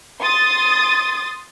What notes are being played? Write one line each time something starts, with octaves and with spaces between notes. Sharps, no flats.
C6 D#6 A6